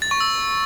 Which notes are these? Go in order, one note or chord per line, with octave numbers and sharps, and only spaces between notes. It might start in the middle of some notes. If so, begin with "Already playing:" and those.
A6
C#6
E6